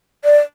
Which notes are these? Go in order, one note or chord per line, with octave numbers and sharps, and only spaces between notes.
D5